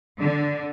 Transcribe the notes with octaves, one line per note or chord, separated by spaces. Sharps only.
D3